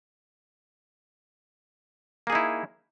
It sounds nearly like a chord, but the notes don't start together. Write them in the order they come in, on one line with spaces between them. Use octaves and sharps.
A#3 G#4 D#4 E4